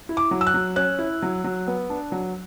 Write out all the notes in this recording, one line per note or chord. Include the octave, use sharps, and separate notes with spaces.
E4
D6
F#3
E6
F#6
F#3
C#4 F#6
E4
F#3
F#3
B3
D4
F#3